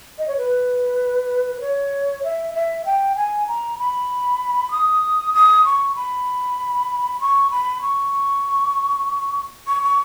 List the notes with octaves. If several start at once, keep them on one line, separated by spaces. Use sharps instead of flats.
D#5
C#5
B4
B4
C#5
E5
E5
G5
G#5
A#5
B5
D#6
D#6
C#6
B5
C#6
B5
C#6
C#6
C#6